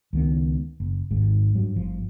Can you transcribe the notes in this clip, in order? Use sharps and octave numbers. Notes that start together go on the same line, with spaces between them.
C#2 D#3 B3
F#1
G#1 D#2 G#2
G2 F#3
G1 F3